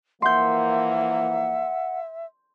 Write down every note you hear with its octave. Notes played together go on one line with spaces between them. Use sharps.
E3 F3 A#3 E5 F#5 C6 G6